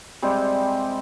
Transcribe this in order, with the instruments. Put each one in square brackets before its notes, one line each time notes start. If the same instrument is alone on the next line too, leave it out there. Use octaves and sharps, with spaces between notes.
[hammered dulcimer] C3 G3 G#3 C4